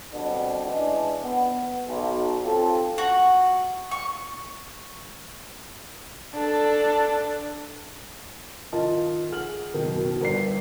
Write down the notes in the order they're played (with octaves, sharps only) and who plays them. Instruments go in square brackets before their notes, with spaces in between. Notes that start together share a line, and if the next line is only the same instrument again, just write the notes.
[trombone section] G2 B2 D3 C4 D4
E3 G#3 C#4 D4
B3
B1
C4 F4 G4 A4
[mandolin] F#4
C#6
[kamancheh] D4 A4
[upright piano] D#3 F4 D#5 A5
G#4 F#5 F6 F#7
F#1 B2 D#3
B2
G1 A#4 D5 C7